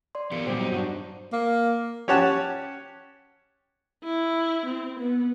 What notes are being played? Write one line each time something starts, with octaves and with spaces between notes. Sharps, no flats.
D5 C6
E3 B3 G4 A#4 C#7 D7
A#2 D3 F#3 G3 C4 G4 C5
D#4
G2 D4 F#4
A#3
C#4 G4 C#5 F#5 A5
E4
C4
B3